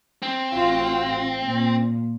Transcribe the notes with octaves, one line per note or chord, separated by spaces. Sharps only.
C4
A1 F4 F#4
A#2